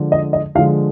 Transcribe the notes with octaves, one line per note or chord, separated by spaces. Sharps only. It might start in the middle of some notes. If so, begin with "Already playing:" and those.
Already playing: D3 F3 G#3
D#5
D#5
D3 F3 G#3 F5